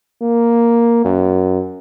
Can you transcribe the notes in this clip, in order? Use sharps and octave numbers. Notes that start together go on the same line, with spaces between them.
A#3
F#2